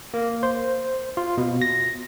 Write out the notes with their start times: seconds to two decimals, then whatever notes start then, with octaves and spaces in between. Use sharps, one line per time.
0.14 A#3
0.43 C5
1.17 F4
1.38 B2
1.62 A#6